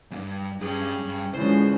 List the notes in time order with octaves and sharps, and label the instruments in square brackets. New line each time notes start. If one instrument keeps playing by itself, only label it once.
[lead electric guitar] E2 G2
[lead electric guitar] G2 G3 [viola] C#4 G#4
[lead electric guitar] G2
[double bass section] D3 G#3 C#4 [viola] E3 F3 [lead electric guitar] C5